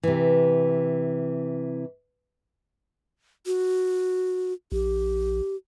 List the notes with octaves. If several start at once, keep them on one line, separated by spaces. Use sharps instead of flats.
C3 E3
F#4
A#1 G4